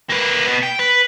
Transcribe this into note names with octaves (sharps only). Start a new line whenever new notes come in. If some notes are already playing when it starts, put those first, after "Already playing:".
A#3 B4
B2 B3
G5
B4